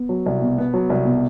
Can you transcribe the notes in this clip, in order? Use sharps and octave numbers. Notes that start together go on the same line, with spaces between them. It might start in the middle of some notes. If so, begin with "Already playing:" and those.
Already playing: B3
F#3
C2
B2
B3
F#3
C2
B2